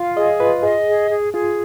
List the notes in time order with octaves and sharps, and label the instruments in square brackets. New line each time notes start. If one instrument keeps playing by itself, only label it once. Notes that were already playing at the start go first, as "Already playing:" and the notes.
Already playing: [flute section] F4 [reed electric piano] F5
[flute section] G#4 [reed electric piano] D#5
[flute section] F4 [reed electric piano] B4
[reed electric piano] G#4 [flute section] D#5
[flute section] G#4
G#4
[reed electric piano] F4 [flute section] G#4